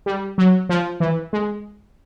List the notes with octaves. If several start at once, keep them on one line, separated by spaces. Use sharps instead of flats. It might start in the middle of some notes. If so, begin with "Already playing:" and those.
G3
F#3
F3
E3
G#3